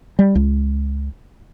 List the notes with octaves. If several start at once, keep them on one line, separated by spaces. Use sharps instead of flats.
G3
C#2